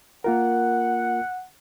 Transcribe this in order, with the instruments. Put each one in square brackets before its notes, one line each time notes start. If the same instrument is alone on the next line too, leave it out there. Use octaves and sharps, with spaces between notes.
[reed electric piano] A#3 F4 A#4 [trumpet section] F#5